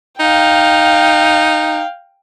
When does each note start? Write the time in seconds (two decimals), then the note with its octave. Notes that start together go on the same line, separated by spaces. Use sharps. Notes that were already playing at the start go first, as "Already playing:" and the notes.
0.20 D#4 F5 G5